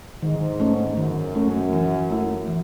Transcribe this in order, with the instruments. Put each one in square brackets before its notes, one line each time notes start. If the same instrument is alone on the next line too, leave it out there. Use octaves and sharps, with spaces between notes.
[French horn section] G#2 [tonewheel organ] D#3
[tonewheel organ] A3 C#4
[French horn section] F#2 [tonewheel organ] D#3
[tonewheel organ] A3 C#4
E3
A3 E4
E3